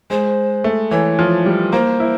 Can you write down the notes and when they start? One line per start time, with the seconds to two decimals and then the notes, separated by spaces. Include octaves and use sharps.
0.10 G#3 C5
0.64 A3
0.91 E3 C#5
1.19 F3
1.46 G3
1.73 A#3 C5
2.00 E4